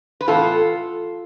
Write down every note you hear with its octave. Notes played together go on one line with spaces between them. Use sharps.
B4
A2 E3 B3 F4 A4